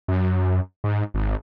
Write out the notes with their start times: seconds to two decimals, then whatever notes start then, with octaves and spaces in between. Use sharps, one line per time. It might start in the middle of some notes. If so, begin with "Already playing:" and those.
0.08 F#2
0.84 G#2
1.14 G#1